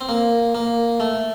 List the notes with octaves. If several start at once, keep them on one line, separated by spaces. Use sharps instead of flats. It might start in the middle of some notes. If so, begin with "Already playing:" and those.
C4
A#3
A#3
A3